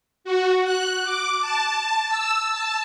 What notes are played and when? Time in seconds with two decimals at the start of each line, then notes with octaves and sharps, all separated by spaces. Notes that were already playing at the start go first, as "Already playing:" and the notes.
0.24 F#4
0.64 F#6
1.04 D6
1.41 A5
1.76 A5
2.09 E6
2.51 A5